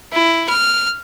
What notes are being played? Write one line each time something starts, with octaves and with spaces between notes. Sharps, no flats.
E4
F6